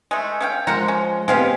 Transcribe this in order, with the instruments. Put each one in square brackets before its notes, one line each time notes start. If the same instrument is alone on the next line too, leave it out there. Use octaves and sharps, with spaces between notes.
[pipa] G#3 A3
C#4 F5 G5
[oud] F3 G#3 [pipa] A#4 F#5
[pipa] C#4
[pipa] G#3 F5 [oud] B3 C4 G4